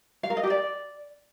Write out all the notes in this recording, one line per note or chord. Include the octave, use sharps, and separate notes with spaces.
F5
A#4
D#5
G4
D5